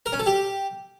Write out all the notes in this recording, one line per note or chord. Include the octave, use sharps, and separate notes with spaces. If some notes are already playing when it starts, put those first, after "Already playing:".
A#4
C#4
A4
G4